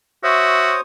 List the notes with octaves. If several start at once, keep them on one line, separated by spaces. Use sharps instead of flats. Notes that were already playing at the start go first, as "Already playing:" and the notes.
F#4 C5 C#5 E5 D#6